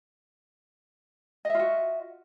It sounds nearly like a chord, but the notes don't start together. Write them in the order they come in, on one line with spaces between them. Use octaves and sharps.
D#5 E5 F4 F#4